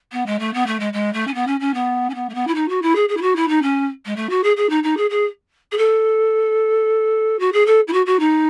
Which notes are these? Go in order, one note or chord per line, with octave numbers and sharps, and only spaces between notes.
B3
G#3
A3
B3
A3
G#3
G#3
A3
C#4
B3
C#4
C#4
B3
C#4
B3
A3
B3
E4
D#4
F#4
E4
G#4
G#4
E4
F#4
E4
D#4
C#4
G#3
A3
F#4
G#4
G#4
D#4
D#4
G#4
G#4
G#4
A4
F#4
G#4
A4
E4
F#4
F#4
D#4